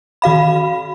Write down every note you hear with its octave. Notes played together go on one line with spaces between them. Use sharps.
D#3 F#4 F5 B5